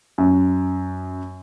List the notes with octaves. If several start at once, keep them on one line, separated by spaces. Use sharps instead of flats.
F#2